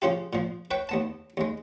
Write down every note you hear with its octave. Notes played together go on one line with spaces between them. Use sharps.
C#3 F3 C#4 F4 G4
A#2 F3
B4 C#5 G5
D#2 B3 A5
D#2 G#3